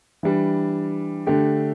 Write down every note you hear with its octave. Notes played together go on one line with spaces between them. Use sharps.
E3 G3 D4
D3 A3 D4 G4